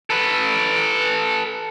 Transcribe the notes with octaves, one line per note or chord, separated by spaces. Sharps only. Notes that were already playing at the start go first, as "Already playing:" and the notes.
A4 B4